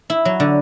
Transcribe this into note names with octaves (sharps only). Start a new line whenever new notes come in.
E4
F#3
D3